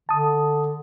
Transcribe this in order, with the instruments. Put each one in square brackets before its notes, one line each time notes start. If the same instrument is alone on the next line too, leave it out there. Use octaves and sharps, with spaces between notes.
[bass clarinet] D3 [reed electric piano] A5 D#6